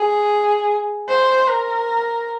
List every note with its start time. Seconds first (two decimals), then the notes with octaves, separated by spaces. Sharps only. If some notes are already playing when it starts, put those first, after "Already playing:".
Already playing: G#4
1.09 C5
1.47 A#4